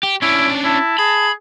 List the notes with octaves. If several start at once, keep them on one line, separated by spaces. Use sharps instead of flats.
G4
C#4 D4 E4 D7
E4 A5
G#4 B5